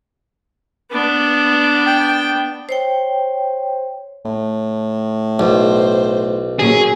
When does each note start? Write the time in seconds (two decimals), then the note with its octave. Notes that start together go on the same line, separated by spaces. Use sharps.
0.92 B3 D4
1.86 G5
2.69 C5 C#5 G5
4.25 A2
5.39 B1 C5
6.59 A#2 F#3 C#4 G#4